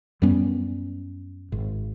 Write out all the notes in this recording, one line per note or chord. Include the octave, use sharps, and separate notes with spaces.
F#2 G3 B3 C#4
G#1